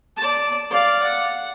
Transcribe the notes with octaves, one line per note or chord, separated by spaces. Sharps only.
D5 A5
D5 F5
F#5